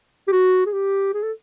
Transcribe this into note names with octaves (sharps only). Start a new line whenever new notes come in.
G4
F#4
G#4
G4
G#4
A4